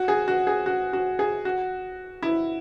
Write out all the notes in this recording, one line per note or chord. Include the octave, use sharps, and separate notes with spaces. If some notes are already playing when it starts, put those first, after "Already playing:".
Already playing: F#4
G#4
F#4
G#4
F#4
F#4
G#4
F#4
E4